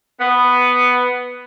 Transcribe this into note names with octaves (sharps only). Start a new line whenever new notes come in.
B3